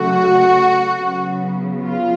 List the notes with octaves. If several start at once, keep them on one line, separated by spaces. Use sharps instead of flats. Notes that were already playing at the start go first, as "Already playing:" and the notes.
Already playing: C#3 F#3 A3 F#4
C#3 F#3 B3
F4